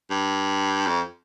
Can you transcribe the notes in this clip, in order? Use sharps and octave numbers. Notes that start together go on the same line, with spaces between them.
G2
F2